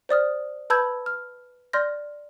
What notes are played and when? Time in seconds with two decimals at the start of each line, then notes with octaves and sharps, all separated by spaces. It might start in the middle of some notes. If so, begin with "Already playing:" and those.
0.09 C5 D5 D#6 F6
0.70 B4 A5 B5 E6 G6 G#6
1.06 F6
1.73 D5 C6 F6 G6 A#6